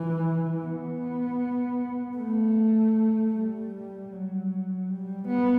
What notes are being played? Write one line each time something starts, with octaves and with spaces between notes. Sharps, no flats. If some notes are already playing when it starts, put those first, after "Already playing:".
Already playing: E3
B3
A3
G3
F#3
G3
B3